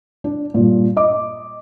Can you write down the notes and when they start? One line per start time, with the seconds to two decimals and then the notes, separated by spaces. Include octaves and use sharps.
0.24 D4
0.54 G2 A#2
0.97 D#5 D6